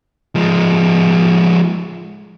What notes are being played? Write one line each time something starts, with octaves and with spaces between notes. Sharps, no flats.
F3 G#3